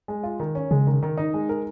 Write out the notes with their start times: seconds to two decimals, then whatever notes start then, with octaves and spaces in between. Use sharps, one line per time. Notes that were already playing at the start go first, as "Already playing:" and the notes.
0.08 G#3
0.23 F4
0.40 D#3
0.55 C#4
0.71 C#3 G#3
0.87 D#3
1.03 D#3
1.17 D#4
1.34 G#3
1.49 A#4